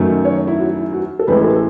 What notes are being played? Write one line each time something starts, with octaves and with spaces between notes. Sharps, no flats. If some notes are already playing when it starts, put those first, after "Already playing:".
Already playing: F#2 D#3 F#3 A3
C#5
E4
F#4
E4
F#4
A4
A1 A2 E3 G#3 B4
A4